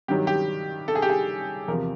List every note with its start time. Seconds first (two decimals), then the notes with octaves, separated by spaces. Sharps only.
0.08 G2 D#3 F#3 G4
0.27 G4
0.88 A4
0.95 G#4
1.02 G4
1.09 G#4
1.68 E2 C3 F3 A#4